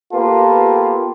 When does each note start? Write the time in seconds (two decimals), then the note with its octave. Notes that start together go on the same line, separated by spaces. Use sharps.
0.13 A#3 B3 F4 G4 A4 B4